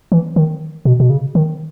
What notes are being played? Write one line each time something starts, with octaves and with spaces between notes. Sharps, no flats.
E3
D#3
B2
B2
C#3
D#3